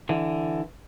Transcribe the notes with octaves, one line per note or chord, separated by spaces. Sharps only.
D3 E3